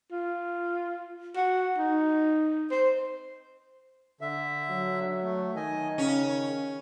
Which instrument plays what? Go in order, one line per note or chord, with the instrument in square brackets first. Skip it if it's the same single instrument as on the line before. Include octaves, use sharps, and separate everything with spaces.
[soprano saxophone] F4
F#4
D#4
C5
[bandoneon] D3 E5
[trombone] F#3
[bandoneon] A3
[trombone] D#3 [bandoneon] D#5 G#5
[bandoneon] C#3 [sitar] C#4